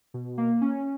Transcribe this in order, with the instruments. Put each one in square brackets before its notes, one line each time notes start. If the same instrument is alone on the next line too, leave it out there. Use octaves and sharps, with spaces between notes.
[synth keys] B2
A#3
C#4